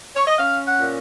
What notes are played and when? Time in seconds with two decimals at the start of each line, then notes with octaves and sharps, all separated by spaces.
0.15 C#5
0.27 D#5
0.38 C#4 F5
0.67 F#5
0.80 A#2